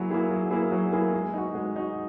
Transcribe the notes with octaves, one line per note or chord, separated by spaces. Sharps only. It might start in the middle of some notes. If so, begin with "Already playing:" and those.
Already playing: F#3 A#3 E4 G#4
A#3 E4 G#4
F#3
A#3 E4 G#4
F#3
A#3 E4 G#4
G#3
D#4 F#4
G#3
D#4 F#4